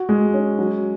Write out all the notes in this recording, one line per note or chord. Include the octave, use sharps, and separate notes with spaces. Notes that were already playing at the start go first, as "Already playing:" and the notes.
Already playing: F#4
G#3
C#4
F#3